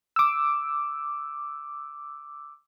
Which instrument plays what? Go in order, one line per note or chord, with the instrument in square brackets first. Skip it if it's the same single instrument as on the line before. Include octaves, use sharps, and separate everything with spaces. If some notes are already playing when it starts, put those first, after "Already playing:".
[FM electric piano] D6 E6